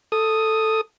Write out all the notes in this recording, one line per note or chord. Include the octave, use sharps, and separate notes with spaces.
A4 D#6